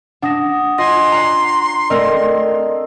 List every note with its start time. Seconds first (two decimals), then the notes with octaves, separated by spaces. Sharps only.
0.22 D4 F#5 D#6 A#6 E7
0.78 F4 D#5 G#5 C6 A#6
1.12 D5 F#5 A#5
1.90 A3 C4 A#4 D5 D#5 E6